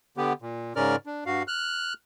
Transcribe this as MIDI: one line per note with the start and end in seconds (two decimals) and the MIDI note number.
0.17 0.33 50
0.17 0.33 59
0.17 0.33 67
0.42 0.73 46
0.76 0.96 44
0.76 0.96 49
0.76 0.96 61
0.76 0.96 70
0.76 0.96 74
0.76 0.96 89
1.06 1.24 62
1.26 1.43 43
1.26 1.43 66
1.26 1.43 77
1.48 1.93 89
1.48 1.93 90